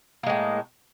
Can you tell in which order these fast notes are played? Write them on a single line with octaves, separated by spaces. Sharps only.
A#3 G#3 A2